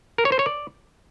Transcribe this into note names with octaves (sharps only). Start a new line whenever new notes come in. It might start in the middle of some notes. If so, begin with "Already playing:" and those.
A#4
C#5
C5
C#5
D5